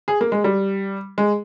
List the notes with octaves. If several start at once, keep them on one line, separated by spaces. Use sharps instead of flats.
G#4
A#3
G#3
G3
G#3